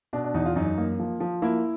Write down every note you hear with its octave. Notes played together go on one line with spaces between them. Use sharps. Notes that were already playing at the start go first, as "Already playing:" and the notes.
B2 D4
D4
E2 D#4
F4
F#2 D#4
A#3
F3
F3
A#3 E4